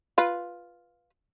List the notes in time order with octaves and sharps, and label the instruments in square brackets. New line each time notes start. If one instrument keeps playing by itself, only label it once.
[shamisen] F4 B4